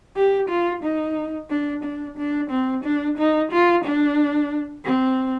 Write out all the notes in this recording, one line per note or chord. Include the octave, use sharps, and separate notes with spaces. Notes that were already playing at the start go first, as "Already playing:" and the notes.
G4
F4
D#4
D4
D4
D4
C4
D4
D#4
F4
D4
C4